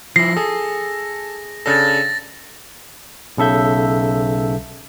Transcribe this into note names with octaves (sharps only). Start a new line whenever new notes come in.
F3 E4 A#6 C7
G#4 A4
C#3 D4 A4 A6 A#6
B1 C#3 A4 E5 G6